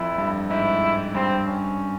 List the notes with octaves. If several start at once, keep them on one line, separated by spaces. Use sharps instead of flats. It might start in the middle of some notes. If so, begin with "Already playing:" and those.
Already playing: F2 E4
G2
G#2 E4
G2 C4
C#4